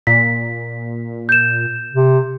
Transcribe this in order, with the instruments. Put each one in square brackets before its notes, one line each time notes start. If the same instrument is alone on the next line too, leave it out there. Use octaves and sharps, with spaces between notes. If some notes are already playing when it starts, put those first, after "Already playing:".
[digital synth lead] A#2 [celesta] B6
[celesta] G6 E7
[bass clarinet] C3